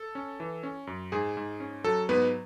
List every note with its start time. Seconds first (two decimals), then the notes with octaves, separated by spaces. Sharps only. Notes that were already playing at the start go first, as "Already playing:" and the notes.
Already playing: A4
0.15 C#4
0.40 E3
0.63 C#4
0.87 F#2
1.12 G#2 G#4
1.37 G#2
1.60 C#4
1.84 F#3 A4
2.09 G#2 B3 B4